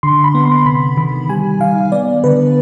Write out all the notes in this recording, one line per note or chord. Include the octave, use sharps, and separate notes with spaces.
D3 C6
B5
B3
C6
C3 B5
D#3 B5
G3 G#5
D#3 F5
B3 D5
D3 B4